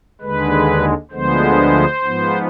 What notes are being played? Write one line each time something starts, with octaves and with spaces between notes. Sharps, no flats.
D#2 D3 G#3 B4
D2 D3 F3 G#3 B3 C5
G#2 F3 B3